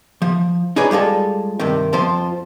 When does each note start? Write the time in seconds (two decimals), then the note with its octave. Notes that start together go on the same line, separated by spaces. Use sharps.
0.22 F3
0.76 D#4 F4 G#4 B4 C#5 D5
0.91 G3 G#3 F4 A4
1.60 G2 C3 D#3
1.93 F2 F3 F4 C5